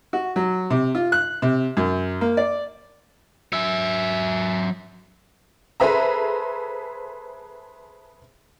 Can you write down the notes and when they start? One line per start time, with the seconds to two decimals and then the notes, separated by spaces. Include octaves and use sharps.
0.13 F#4
0.36 F#3
0.70 C3
0.95 F4
1.12 F#6
1.42 C3
1.77 F#2
2.21 A#3
2.37 D5
3.53 F#3 E5
5.80 G#4 A4 B4 C5 E5 A#5